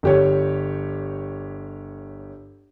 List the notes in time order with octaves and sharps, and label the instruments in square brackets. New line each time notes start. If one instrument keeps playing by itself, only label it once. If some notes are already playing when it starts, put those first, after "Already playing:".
[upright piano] G1 G4 C#5